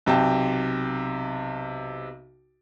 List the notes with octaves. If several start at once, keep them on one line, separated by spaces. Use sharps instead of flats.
B1 C3 G5 A5